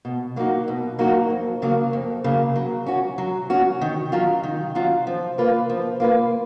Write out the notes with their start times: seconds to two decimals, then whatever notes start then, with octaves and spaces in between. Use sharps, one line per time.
0.05 B2
0.36 F#3 A#3 D#4 F#4
0.68 B2
0.99 F#3 A#3 D#4 F#4
1.30 F2
1.62 C#3 F#3 A#3
1.93 F2
2.24 C#3 F#3 A#3
2.56 F#3
2.87 C#4 F#4
3.18 F#3
3.50 C#4 F#4
3.81 D#3
4.12 F#3 C#4 F4
4.43 D#3
4.75 F#3 C#4 F4
5.07 F3
5.38 A#3 F4 B4
5.70 F3
6.00 A#3 F4 B4